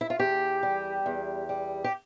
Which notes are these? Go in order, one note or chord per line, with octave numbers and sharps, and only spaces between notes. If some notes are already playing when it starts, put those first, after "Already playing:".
E4
F4
E2 G4
G3
E2
G3
G4